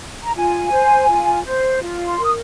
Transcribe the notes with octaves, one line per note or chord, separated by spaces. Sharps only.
A#5
F4 G#5
C5
F4
C5
F4
C6
A#4
D#6